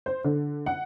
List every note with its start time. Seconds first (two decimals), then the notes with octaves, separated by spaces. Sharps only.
0.06 C5
0.25 D3
0.66 F#5